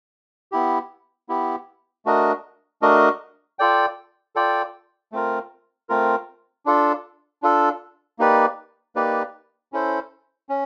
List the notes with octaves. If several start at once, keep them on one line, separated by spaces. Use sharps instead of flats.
B3 E4 G4
B3 E4 G4
A3 D4 F#4 A#4 D#5
A3 D4 F#4 A#4 D#5
F4 A4 D5 G5
F4 A4 D5 G5
A3 C4 F4 A#4
A3 C4 F4 A#4
D4 F4 A4
D4 F4 A4
A#3 D#4 G4 B4 D5
A#3 D#4 G4 B4 D5
C#4 E4 A4 C5
C#4